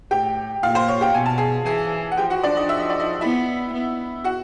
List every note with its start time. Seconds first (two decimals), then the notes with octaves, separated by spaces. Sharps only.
0.11 A2 G4 G5
0.63 A#2 F4 F5
0.75 C5
0.88 C#5
1.01 G4 G5
1.14 B2 G#5
1.26 A5
1.38 G#4 G#5
1.66 E3 G#4 G#5
2.12 F#5
2.17 F3 G4 G5
2.30 F#4 F#5
2.43 D4 D5
2.57 D#4 D#5
2.69 E5
2.80 D#5
2.90 D5
2.99 D#4 D#5
3.21 B3 E4 E5
3.73 B3
4.24 F#4 F#5